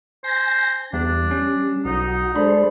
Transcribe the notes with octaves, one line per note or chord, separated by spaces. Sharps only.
C5 G#5 A#6
E2 G3 D4
C#4
B1 D#4 F#4
G#3 D4 A4 C5 B5